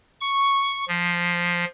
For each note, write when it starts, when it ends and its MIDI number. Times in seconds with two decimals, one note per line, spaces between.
0.21 0.84 85
0.88 1.65 53